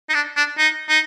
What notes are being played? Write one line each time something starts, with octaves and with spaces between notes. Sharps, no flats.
D#4
D4
D4
D#4
D#4